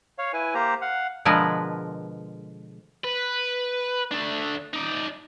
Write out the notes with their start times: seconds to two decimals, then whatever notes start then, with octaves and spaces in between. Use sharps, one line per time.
0.18 C#5 F5
0.33 E4 B4 G#5
0.55 A#3 G4 C5 A#5
0.81 F5 F#5
1.25 B2 D3 F3 G#3 A#4 B4
3.04 B4
4.12 A3 D4
4.73 D#4 D5